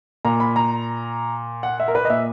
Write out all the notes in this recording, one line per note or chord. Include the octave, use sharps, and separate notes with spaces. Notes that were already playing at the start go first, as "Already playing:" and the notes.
A#2 A#5
B5
A#5
F#5
E5
A#4
B4
D#5
A#2 E5